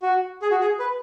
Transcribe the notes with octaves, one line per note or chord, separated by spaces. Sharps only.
F#4
G#4
F#4
G#4
B4